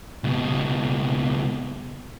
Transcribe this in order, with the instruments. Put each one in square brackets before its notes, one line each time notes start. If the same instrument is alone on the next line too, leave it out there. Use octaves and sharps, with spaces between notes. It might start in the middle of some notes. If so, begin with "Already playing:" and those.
[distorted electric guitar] C#2 B2